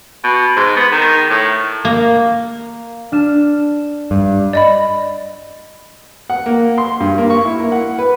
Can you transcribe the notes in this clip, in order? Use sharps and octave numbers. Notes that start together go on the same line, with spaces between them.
B2
G#2
B3
D#3
A2
A#3
D4 F6 E7
G2
D5 D#5 B5
F#5
A#3
C6
G2
A#3
C#6
E4
A#3
F#5
B4